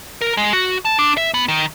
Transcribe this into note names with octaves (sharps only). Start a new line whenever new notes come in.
A#4
G#3
F#4
A5
D4
E5
B3
D#3